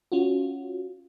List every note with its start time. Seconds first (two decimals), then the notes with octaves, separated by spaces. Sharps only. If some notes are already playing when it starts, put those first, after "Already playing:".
0.12 C#4 F4 F#4